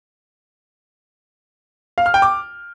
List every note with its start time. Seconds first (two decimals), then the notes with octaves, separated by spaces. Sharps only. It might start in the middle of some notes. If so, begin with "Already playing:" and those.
1.98 F5
2.06 F6
2.14 G5
2.22 D6